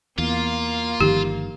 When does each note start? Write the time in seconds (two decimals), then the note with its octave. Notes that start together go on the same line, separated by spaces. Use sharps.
0.18 E2 A#3 F4
1.01 G1 D#3 F3 G4